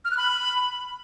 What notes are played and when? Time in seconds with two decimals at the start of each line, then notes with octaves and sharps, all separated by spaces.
0.05 F6
0.11 F#6
0.17 B5